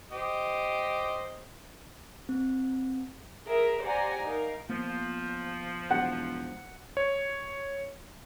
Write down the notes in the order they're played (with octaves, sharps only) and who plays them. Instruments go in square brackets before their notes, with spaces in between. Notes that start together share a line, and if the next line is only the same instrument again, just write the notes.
[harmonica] G4 C5 D#5
[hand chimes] C4
[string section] G#4 A#4 E5
G4 C5 D5 F#5 G#5 A#5
D#4 A#4 F5
[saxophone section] F3 [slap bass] A#3 B3
[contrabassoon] E1 [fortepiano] F#5
[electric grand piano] C#5